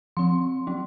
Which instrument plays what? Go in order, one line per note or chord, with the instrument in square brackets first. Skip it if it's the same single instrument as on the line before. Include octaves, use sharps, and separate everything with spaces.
[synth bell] F3 C4 C6
F#3 C#4